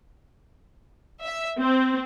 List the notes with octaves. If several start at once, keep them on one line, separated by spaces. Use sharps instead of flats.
E5
C4